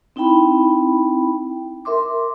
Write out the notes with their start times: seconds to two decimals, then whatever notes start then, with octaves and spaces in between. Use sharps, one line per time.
0.16 C4 D#4 E4 G5 B5
1.85 A#4 E5 C6 D6